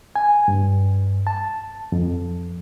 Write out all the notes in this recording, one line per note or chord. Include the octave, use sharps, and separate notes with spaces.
G#5
G2
A5
F2